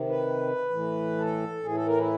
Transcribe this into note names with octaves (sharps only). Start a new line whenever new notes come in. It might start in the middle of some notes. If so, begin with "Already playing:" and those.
Already playing: C3 D#3
B4
A2 E3
A4
A2 E3 G#4
A4
A#4
E4